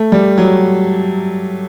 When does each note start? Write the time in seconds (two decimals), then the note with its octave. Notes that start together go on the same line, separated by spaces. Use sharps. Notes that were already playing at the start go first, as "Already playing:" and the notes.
Already playing: A3
0.12 G3
0.38 F#3